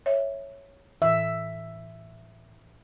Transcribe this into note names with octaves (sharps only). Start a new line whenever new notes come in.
C#5 E5
A2 E3 E5